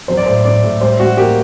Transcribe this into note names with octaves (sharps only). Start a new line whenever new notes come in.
F#3 C5
D5
A2 C5
A2 D5
A2
G3 C5
G3 F#4
A#3 G4